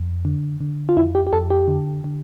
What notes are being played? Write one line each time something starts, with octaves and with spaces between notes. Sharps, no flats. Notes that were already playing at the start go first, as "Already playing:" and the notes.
Already playing: F2
D3
D3
F4
F2 E4
G4
G4
F2 A4
G4
D3
D3